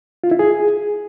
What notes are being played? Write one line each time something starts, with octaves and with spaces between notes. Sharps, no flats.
F4
E4
G#4